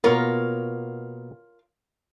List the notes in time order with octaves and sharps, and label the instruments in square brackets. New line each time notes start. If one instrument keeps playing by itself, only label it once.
[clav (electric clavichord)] B2 A#3 B3 [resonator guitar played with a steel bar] F4 A#4 C#5